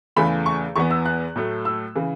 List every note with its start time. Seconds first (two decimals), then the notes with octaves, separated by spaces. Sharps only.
0.16 E2 C#3 E3 A3 B5
0.46 C#6
0.76 E2 E3 B3 C#6
0.91 E6
1.05 F#6
1.36 A2 F#3 A3
1.65 E6
1.95 C#3 E3